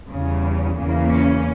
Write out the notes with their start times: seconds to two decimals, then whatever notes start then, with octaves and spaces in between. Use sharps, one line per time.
0.09 E2 C#3 G3
0.77 E2 C#3 E3 A#3
1.11 C#4